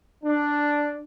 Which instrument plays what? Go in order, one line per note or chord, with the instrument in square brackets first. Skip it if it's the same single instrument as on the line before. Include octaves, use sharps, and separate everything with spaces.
[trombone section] D4